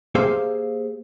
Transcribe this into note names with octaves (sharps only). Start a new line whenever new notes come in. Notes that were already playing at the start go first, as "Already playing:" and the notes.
A#3 G4 G#4 C5 E5 F5